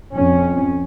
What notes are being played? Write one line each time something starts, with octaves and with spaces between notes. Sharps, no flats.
F2 C#4